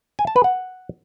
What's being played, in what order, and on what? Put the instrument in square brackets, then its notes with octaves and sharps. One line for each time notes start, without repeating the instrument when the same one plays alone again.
[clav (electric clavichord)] G#5
A5
B4
F#5